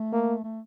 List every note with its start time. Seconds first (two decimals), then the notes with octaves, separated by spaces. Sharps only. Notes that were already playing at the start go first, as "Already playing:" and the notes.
Already playing: A3
0.13 A#3
0.44 A3